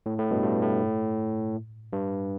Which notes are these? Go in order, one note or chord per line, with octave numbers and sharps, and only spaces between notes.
A2
A2
G2 B2
G2
A2
G2